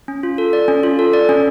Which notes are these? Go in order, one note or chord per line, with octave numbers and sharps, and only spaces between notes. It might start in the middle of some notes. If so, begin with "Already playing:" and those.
C#4
F4
A4
D5
C#4
F4
A4
D5
C#4